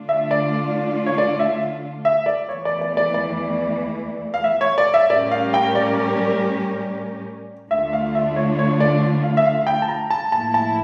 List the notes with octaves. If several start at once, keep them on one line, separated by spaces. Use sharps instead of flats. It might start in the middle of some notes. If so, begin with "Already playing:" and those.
Already playing: D3 A3 D4 F4
E5
D5
C#5
D5
E5
E5
D5
E2 E3 A3 C#5
D5
D5
D5
D5
F5
E5
C#5
D5
E5
A2 G3 C#4 G4 A#4 D5
F5
G5
D5
D2 D3 A3 D4 F4 E5
F5
E5
C#5
C#5
D5
F5
E5
F5
G5
A5
A#5
A5
A2 F3 A#3 E4 A5
A5